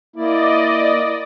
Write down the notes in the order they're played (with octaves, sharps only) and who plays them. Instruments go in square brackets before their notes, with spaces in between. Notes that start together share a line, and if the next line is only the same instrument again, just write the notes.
[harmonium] A#3 E4 [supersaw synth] D5 D#5